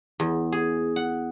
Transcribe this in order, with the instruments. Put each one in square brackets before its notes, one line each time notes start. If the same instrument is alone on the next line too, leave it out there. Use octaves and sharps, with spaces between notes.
[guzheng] E2
G#4
F#5